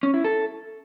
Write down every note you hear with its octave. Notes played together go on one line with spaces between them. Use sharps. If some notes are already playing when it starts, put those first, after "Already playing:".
C#4
E4
A4